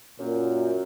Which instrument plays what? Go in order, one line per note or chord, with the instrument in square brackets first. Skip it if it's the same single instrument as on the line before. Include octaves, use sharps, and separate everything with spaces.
[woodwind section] F#2 [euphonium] A#2